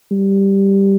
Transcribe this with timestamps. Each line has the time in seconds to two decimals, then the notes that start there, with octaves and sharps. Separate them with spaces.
0.12 G3